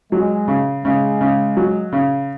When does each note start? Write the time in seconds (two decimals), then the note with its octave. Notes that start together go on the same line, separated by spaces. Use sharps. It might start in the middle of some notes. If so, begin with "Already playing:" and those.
0.12 F#3 G#3
0.48 C#3
0.84 C#3 G#3
1.21 C#3
1.57 F#3
1.92 C#3